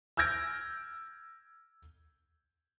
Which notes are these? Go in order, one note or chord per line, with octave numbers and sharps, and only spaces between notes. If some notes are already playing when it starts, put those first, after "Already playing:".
E6 F6 G6 G#6 A#6 D7